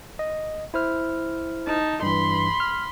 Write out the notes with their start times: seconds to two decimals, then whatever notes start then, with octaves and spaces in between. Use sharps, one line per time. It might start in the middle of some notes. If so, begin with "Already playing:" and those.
0.19 D#5
0.74 E4 C5 F6
1.66 D#4 A5
2.02 G2 E3 B5 C6
2.60 F6